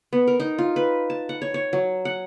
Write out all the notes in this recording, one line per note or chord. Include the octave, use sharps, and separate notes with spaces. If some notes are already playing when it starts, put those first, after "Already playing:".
B3
A#4
D#4
F4
B4
A5
F#5
C#5
C#5
F#3
F#5